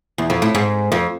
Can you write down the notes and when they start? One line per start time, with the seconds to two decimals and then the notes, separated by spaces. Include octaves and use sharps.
0.18 E2
0.30 F2
0.42 A2
0.55 G#2
0.92 F2